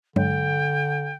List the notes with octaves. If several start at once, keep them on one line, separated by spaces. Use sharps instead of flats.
G2 D3 F#3 G#3 G5